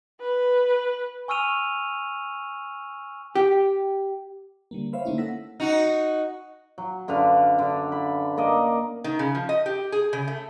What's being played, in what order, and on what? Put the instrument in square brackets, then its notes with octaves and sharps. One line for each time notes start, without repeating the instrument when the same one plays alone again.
[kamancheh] B4
[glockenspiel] G#5 C#6 E6 F6 D#7 F7
[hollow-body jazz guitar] G4
[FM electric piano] D3 G3 A#3
C5 C#5 E5 F5 B5
D3 A3 A#3 C#4 D#4 E4
A#3 A4 F#5 E6 A#6 B6
[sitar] D#4 F#4
[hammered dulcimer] F#3
F#2 D3 B4 F5
D3
B5
A#3 D5 D#5
[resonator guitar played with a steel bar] D#3
C#3
F3
D#5
G4
G#4
C#3
A3